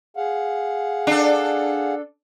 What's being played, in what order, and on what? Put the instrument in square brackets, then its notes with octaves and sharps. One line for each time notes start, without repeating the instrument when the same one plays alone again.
[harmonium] G#4 F5 F#5
[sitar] D4 A4